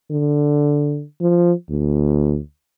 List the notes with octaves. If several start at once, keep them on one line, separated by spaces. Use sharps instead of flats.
D3
F3
D2